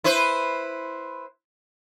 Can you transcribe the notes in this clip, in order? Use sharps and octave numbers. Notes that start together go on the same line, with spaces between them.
E4 B4 C5